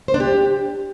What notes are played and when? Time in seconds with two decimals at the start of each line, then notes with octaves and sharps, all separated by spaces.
0.08 C5
0.14 D4
0.20 G4